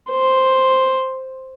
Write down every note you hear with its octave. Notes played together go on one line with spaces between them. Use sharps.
C5